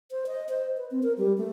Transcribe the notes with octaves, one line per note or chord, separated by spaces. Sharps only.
C5
D#5
C5
B4
C4
A#4
G3
A3